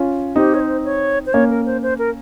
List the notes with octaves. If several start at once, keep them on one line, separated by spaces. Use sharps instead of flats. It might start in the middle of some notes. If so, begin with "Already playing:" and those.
Already playing: C#4 F4
C4 D#4 G4
C#5
C5
C#5
C5
A#3 C#4 C#5
A#4
C5
C5
A#4